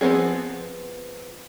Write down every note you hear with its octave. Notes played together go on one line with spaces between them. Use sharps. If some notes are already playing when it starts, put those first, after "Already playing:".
F3 B3 C4 D4 G#4